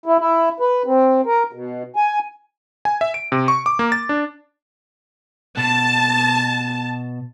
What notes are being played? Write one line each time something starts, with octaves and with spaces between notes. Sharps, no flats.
E4
E4
B4
C4
A#4
B2
G#5
G#5
E5
D7
C3
C#6
D6
A#3
A6
D4
B2 A5